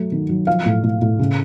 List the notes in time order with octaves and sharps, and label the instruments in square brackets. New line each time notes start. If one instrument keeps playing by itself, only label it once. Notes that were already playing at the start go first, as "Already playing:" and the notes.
Already playing: [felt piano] F#3 A3
D#3
F#3
F3 F5
A2
A2
A2
C#3